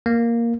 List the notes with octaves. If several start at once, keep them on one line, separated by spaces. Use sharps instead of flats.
A#3